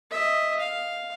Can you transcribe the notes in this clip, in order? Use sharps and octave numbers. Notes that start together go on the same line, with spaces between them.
D#5 E5
F5